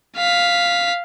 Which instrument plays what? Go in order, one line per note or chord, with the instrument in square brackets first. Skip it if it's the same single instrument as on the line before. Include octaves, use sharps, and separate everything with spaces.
[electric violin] F5 B6